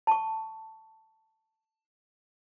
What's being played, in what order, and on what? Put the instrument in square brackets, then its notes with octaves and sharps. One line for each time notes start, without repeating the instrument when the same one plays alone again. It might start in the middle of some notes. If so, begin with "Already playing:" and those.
[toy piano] A5 C#6